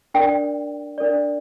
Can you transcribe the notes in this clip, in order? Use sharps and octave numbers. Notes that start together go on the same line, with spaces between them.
D4 A#4 D5 G5
D4 A#4 D5